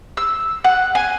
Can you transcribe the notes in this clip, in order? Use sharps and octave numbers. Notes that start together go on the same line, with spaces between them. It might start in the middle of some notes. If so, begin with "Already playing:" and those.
E6
F#5
G#5